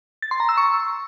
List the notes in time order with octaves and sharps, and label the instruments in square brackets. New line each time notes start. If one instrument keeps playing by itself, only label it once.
[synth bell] A6
C6
A#5
E6
C#6